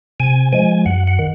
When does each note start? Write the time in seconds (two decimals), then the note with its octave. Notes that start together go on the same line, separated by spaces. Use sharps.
0.20 C3 G#5
0.53 F3 G#3 G#5
0.86 F#2 F#5
1.07 F#5
1.19 D#3